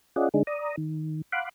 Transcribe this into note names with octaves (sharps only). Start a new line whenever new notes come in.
C#4 F4 G#4 D5 D#5 F#5
D3 G#3 D4 D#4 G#4
D5 A#5 D#6
D#3
F5 F#5 B5 C6 D6 F#6